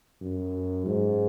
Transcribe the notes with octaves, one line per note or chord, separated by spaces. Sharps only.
F#2
G#2